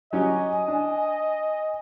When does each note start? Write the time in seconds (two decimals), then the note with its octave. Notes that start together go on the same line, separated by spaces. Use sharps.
0.13 F#3 C#4 G4 D#5 G#5
0.68 D4